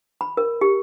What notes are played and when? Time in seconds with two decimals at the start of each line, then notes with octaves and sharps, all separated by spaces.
0.21 B5
0.37 A#4
0.61 G4